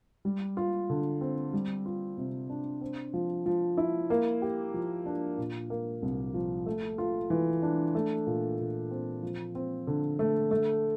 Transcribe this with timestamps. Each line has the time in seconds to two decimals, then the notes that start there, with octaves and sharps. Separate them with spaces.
0.25 G3
0.57 F4
0.90 D3
1.21 C4
1.53 G3
1.86 F4
2.17 C3
2.50 D4
2.81 C4
3.14 F3
3.46 F3
3.77 E4
4.10 A#3
4.42 G4
4.74 F3
5.06 D4
5.38 A#2
5.70 A#3
6.02 C2
6.34 F3
6.66 A3
6.98 F4
7.30 E3
7.62 D4
7.95 A3
8.27 A#2
8.59 A#2
8.91 C4
9.23 F3
9.55 C4
9.87 D3
10.19 A3
10.51 A3